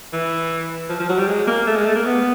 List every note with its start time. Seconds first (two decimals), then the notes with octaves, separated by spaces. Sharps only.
0.13 E3
0.89 F3
0.99 F3
1.09 F#3
1.19 G3
1.28 G#3
1.47 A#3
1.67 A3
1.76 G#3
1.86 A3
1.95 A#3
2.05 B3